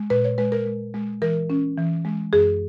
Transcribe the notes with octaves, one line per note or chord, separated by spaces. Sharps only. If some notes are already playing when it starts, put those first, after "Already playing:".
Already playing: G#3
A#2 B4
C#5
G#3 B4
A#4
G#3
G#3
E3 A#4
C#4
E3
G#3
F#2 G#4